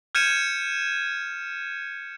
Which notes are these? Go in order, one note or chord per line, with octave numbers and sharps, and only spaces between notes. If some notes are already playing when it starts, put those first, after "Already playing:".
F6 G6 G#6 C#7 D#7 E7